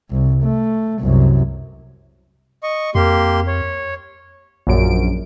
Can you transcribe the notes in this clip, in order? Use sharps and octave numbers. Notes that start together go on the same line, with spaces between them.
C2
A3
C2 F#2
D#5 C#6
F2 A#3 G4 C6
C#5
A#1 F#2 D7